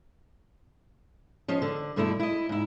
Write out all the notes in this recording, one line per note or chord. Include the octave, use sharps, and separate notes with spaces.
F3 C#4 C5 D#5
D3
G2 B2 D3 A3 E4
E4 D#5
G#2 E4